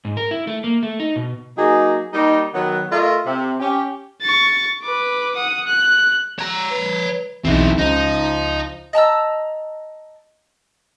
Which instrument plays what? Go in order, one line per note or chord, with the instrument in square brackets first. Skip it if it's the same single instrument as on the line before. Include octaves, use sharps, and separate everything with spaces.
[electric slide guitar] G#2
A#4
E4
A3
A#3
A3
D#4
B2
[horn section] F#3 A#3 D#4 G#4
G3 A#3 D#4
D#3 F#3 B3
A3 F4 A#4 D#5 E5
C3
C#4 G4
[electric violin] C#6 A6
B4 D6
F#5 D#6
F#6
[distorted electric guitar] C#5 A#5
[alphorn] B4
[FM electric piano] B1 E2 [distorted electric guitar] C4 D#4 [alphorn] E4
[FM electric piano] C#2 A#5 [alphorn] F3 [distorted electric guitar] D#4
[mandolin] D#5 A5 A#5 E6